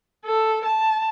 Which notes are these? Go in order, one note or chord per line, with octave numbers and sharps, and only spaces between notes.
A4
A5